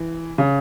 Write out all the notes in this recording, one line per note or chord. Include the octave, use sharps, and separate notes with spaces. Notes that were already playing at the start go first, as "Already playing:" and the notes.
Already playing: E3
C#3